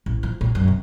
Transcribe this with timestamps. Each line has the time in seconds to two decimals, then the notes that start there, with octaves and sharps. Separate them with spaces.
0.06 A1
0.23 F3
0.41 A2
0.55 F#2
0.68 C3